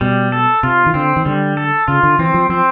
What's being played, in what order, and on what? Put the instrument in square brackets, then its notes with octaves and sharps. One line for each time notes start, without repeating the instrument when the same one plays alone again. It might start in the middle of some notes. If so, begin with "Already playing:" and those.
[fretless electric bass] B2 [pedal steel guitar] G3
[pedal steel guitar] A4
[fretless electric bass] C3 [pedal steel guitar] F4
[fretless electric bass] D#3
[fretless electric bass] D3 [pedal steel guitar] C4
[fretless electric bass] D#3
[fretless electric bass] D3 [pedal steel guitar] G3
[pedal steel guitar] A4
[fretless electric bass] C#3 [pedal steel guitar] F4
[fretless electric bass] D3
[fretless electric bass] E3 [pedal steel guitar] C4
[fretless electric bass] F3
[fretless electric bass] F3 [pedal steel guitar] C4